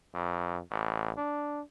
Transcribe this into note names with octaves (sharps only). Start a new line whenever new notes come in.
F2
A1
D4